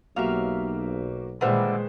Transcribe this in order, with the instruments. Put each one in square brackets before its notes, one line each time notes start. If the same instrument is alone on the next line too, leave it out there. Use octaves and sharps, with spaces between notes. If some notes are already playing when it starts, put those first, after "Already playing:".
[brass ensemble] B1 [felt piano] A#3 F#4 G4 [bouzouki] E5 F5
[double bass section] A#2 D#3 G#3 [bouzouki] D3 G3 E5 [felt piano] B4 C5